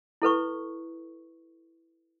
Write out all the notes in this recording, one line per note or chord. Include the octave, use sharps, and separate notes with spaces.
E4 A4 B4 C#6